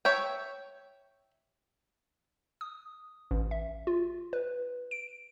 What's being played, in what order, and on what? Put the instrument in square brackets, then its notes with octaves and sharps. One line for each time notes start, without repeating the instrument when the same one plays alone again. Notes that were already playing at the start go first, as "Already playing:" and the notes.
[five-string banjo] C#5 E5 G5
[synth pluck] D#6
A1
E5
F4
B4
D7